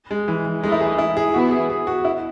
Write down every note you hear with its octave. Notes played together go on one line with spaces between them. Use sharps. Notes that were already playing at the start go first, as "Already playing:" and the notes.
G#3
E3
E3
E3 G#3 A3 D#4
E4
G#4
E4
G#4
E3 B3 E4 F#4
G#4
G#4
F#4
E4